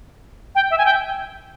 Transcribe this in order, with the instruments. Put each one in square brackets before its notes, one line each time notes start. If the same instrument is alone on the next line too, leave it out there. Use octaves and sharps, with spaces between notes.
[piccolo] G5
E5
G#5
G5